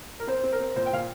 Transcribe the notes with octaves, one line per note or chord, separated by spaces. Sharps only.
A#4
C4 C5
C4
A#4
C4
A#2 C5
G5
A#2 F5